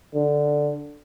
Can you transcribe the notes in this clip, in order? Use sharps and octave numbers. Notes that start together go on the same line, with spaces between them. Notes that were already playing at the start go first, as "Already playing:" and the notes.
D3